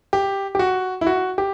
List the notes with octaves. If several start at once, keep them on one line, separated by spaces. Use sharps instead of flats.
G4
G4
F#4
E4
F#4
G4